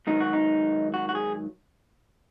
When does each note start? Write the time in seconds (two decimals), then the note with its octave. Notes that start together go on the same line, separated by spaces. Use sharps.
0.07 G#2 D#3 F#3 D#4
0.20 F#4
0.33 D#4
0.94 F#4
1.09 F#4
1.15 G#4